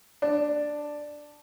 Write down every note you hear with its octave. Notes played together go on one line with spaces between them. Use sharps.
D4